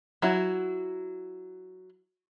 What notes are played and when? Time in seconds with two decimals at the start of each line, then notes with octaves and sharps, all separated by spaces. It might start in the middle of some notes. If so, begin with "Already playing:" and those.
0.22 F#3 E4 F#4